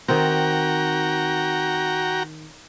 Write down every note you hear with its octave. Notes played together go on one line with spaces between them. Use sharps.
D#3 C4 F#4 G5 A#5